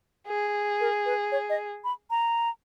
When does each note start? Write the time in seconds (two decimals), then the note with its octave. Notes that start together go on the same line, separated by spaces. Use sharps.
0.28 G#4
0.81 A#4
1.06 B4
1.32 C#5
1.50 D#5
1.84 B5
2.10 A#5